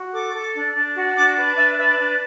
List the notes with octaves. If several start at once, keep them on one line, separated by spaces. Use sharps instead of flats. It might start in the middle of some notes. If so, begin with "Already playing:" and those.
Already playing: F#4
A4 D6
A4
D4
D4
F#4
D4 D6
B4
D4 E5
B4 E5
D4